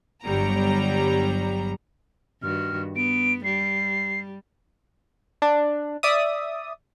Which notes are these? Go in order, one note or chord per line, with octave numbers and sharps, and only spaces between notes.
G1 F#3 G3 A#5
G2 D#3 F#4 F6
B3 D7
G3 C7
D4
D5 E5 D#6